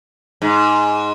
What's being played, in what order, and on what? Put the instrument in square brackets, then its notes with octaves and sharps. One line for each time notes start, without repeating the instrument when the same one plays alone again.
[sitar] G#2